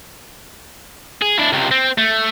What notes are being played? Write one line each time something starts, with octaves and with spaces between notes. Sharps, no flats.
G#4
D4 E4
C#2 C3
C4
A3